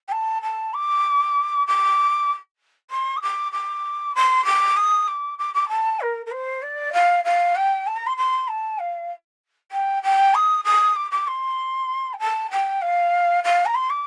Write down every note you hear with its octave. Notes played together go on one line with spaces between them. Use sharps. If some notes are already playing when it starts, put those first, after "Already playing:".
G5
A5
A5
D6
D6
C6
D#6
D6
D6
C6
D6
D#6
D6
D6
D6
A5
A#4
A#4
C5
D5
F5
F5
G5
A5
A#5
C6
C6
A5
F5
G5
G5
D#6
D#6
D6
D6
C6
G5
A5
G5
F5
F5
A#5
C6
D6